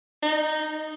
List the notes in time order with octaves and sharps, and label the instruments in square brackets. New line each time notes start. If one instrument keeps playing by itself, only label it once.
[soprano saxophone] D#4